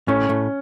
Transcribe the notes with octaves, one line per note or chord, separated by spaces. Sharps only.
A2 A3 C#4
A2 A3